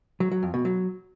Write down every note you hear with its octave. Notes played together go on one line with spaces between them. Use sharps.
F#3
F#3
F2
B2
F#3